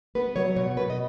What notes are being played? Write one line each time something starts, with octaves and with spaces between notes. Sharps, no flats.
B3 B4
F#3 C#5
B2 C#5
B2 B4
D#5